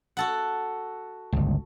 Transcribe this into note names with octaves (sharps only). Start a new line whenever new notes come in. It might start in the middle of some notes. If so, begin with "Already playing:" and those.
F#4 A4 F#5
G1 C#2